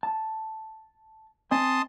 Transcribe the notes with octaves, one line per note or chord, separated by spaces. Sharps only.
A5
C4 D#5 G#5 A5 C6 D#6